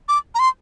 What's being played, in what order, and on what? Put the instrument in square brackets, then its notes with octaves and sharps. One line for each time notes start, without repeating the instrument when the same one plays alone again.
[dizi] D6
A#5
C6